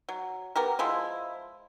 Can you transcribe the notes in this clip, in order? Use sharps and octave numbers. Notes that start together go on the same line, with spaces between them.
F#3
B3 G4 A#4
F3 G#3 E4